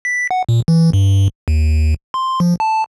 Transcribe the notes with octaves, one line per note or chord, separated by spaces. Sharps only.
B6
F#5
A#2
E3
G2
D#2
C6
F3
A5